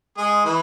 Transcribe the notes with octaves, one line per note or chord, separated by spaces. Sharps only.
G#3 G#4
E3 E4